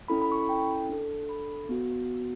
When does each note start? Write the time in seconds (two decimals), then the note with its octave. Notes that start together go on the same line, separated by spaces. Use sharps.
0.08 C#4 E4 A4 B5
0.22 B5
0.32 C#6
0.36 B5
0.49 G5
0.89 D4 A4
1.29 B5
1.69 B3 F#4